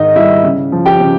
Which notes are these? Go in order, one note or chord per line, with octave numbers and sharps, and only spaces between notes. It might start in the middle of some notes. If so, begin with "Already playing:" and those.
Already playing: G#2 D#3 D#4 D#5
G3 E4 E5
C#3
F3
G4 G5
C#3